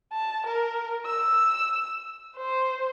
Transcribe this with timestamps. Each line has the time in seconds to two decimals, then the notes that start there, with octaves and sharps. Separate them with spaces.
0.13 A5
0.47 A#4
1.06 E6
2.36 C5